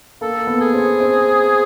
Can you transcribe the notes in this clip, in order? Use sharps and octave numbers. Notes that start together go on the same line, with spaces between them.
A#3 A4
B3
G#4
C4
C4